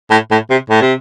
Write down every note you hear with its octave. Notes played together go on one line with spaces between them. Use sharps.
A2
A2
C3
A2
C3